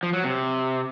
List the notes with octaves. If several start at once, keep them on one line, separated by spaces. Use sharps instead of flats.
F3
F#3
C3